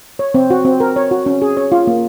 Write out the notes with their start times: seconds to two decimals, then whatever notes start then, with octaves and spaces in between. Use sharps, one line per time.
0.19 C#5
0.34 C4
0.50 F#4
0.65 C4
0.80 A#4
0.96 C#5
1.11 F#4
1.26 C#4
1.42 G#4
1.57 C#5
1.72 F4
1.87 A#3